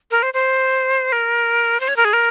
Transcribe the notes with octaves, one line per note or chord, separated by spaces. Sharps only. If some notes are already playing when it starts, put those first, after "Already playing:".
A#4
C5
C5
A#4
C5
C#5
A#4
G#4
A#4